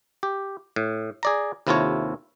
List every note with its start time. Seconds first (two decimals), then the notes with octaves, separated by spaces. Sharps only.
0.23 G4
0.76 A2
1.23 G#4 D5 A#5
1.67 D#2 C3 E4 F4 A4 C#5